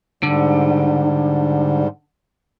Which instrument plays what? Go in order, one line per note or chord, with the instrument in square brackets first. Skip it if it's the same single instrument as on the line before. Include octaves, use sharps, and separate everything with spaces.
[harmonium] G#2 G3 [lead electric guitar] D3